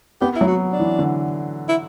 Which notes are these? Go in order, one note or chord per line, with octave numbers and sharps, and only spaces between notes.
B3 G4
E4
F#3
F#4
D4
E3
D3
E4